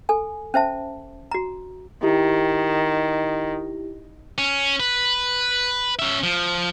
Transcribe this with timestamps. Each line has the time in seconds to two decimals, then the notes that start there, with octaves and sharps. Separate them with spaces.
0.09 A4 G#5
0.54 C#4 C5 E5 A5
1.31 F#4 A#5
2.03 D#3 E4 G4
4.38 C#4
4.80 B4
5.99 C#4 E5
6.23 F3